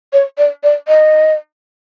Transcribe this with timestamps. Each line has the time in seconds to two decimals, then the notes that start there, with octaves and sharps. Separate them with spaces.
0.13 C#5
0.38 D5
0.63 D5
0.88 D#5